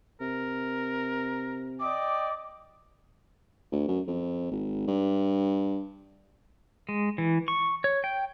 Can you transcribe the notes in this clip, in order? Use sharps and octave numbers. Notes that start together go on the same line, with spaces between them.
C3 A#4
D5 D#5 G5 D6
D2
F#2
F2
G#1
G2
G#3
E3
C#6
C#5
G5